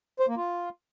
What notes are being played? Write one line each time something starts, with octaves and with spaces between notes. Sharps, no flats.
C5
A#3
F4